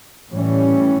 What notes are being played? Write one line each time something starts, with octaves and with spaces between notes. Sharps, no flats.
A2 E3 G3 C#4